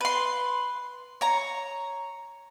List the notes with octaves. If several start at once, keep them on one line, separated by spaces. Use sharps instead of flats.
B4 C6
C#5 A#5